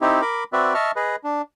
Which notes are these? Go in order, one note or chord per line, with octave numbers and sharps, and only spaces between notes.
C4 D#4 E4 G4
A#4 B5 D6
C4 F#4 B4 D5 E5
D#5 E5 A5 C#6 F6
G#4 B4 D#5
D4